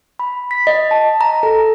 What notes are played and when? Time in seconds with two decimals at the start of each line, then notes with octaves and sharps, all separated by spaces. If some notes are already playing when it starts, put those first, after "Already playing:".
0.19 B5
0.51 B6
0.67 D#5
0.91 A5
1.21 A#5
1.43 A4